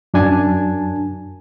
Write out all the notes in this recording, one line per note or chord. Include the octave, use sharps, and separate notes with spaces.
F#2 D4 G#5 A5